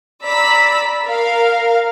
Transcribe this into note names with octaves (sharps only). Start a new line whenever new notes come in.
D5 A#5 B5 E6 B6
A#4 F5